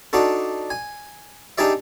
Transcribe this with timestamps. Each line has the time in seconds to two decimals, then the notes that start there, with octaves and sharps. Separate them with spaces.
0.13 D4 D#4 F#4 A4
0.70 G#5
1.58 D4 D#4 G4 G#4 D5 E5